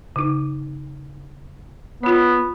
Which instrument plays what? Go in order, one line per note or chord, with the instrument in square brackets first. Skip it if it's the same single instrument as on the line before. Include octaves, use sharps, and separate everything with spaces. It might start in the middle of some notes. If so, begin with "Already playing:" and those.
[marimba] C#3 D#4
[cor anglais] B3 [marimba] F4 C#5